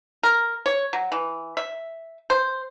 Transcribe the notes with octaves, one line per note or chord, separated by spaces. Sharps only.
A#4
C#5
F#3
E3
E5
C5